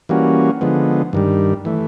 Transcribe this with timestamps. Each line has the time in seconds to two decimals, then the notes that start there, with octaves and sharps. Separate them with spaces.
0.09 E3 G3 A#3 C#4 F#4
0.61 D3 F3 G#3 B3
1.13 G2 D#3 G3
1.65 E3 A3